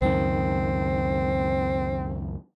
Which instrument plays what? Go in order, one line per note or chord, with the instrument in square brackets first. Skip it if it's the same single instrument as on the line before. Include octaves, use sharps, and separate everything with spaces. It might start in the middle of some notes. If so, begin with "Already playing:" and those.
[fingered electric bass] C#2 F#2 D#3 [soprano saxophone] C4